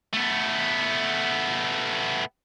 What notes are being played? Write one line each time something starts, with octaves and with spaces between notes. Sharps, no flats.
A3 B3